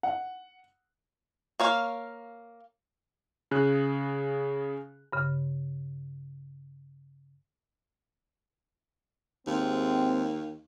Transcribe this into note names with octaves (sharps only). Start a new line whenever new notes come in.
F#5
A#3 C#5 F5
C#3 G#4 F#6
G2 C#3
G#1 D#2 C4